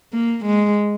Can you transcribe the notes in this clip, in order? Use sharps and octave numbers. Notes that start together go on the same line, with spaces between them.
A#3
G#3